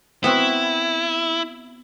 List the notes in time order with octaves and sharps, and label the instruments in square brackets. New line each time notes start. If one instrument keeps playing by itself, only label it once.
[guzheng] B3 C4 F#4 [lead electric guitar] E4